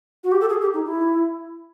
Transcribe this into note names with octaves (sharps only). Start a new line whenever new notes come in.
F#4
G4
A4
G#4
G4
D#4
E4